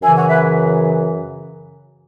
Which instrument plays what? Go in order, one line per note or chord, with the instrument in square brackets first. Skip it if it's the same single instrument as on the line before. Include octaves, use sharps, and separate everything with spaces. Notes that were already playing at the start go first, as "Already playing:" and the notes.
[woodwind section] F#2 C#3 E3 E5 G#5
C#5 F#5
B4 E5